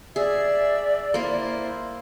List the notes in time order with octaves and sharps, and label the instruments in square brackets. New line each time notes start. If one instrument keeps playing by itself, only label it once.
[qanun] G#4 [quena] D5 [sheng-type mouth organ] E5
[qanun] A#3 A#4 [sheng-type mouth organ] E4 C5